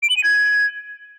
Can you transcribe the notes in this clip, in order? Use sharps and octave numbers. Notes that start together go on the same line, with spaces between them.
D7
F#7
D#7
G#6